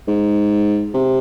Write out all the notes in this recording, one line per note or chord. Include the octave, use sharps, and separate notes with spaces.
G#2
C3